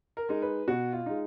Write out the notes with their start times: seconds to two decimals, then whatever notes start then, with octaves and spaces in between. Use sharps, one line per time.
0.17 A#4
0.29 G#3 D#4
0.42 B4
0.68 B2 F#4
0.93 F4
1.06 G#3 D#4